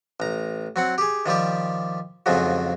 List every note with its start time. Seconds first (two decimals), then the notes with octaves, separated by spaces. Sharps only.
0.20 A1 A#5
0.76 F#3 C4 F#5
0.98 G4 G#4
1.26 D#3 F3 G3 G4
2.26 F2 G#2 C#3 F3 F#3